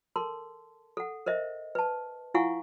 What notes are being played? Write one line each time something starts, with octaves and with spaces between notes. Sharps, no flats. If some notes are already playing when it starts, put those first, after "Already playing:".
A4 A#4 A5 C6
A4 F#5
A#4 C5 D#5 E5
B4 A5
E4 F4 F5 F#5 G#5 C#6